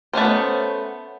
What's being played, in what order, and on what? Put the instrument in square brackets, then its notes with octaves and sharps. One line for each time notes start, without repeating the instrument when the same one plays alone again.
[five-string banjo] A3 B3 C#4 C5